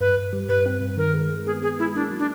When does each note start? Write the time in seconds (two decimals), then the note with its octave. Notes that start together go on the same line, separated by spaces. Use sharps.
0.01 G2 B4
0.17 G2
0.33 G3
0.49 G2 B4
0.66 C4
0.81 G2
0.97 D#3 A#4
1.14 G#3
1.29 G#3
1.46 B3 G#4
1.62 B3 G#4
1.79 G#3 E4
1.95 A#3 D4
2.10 F#3
2.19 D4